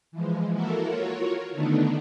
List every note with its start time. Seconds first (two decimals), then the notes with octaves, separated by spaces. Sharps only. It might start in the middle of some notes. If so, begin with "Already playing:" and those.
0.12 E3 F3 G#3
0.52 A#3 E4 F#4 A4 A#4
0.85 F4 F#4 A#4 C#5
1.52 D3 D#3 A3 B3 D4 D#4